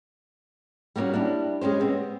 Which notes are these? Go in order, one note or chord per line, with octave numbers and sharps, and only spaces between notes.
G3 A#3 B3 C#4 F#4
D4 E4 G4
G#3 C#4 G4 C5
B3 C4